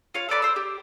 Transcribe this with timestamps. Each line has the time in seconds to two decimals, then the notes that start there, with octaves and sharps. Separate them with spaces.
0.14 F4 C#5 F5
0.29 A4 B4 D5 B5
0.42 C5 E6
0.56 G4